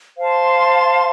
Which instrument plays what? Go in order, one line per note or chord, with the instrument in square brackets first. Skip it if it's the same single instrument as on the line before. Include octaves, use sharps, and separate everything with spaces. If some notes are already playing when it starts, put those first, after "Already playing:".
[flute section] C5 F5 A5 C6